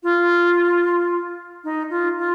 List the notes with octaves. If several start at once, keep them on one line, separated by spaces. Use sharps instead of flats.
F4
D#4
F4
F4